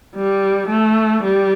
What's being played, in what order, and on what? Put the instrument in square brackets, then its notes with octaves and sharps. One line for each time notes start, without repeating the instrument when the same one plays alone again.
[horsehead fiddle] G3
A3
G3